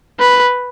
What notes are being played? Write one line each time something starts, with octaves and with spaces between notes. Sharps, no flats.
B4